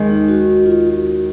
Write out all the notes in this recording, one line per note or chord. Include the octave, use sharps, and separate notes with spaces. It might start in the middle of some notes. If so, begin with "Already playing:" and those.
Already playing: D#2 D#3 G#3
D#4
F#4
F#4
F4
F#4
F#4